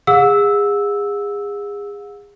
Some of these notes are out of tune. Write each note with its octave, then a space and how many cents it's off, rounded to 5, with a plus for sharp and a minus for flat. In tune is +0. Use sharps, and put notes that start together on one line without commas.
G#4 -30 F#5 -45 E6 -10